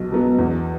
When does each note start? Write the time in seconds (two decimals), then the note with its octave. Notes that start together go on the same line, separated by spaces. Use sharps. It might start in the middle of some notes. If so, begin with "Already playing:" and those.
Already playing: B1 B2 F#3 B3
0.12 B2 F#3 B3
0.38 E2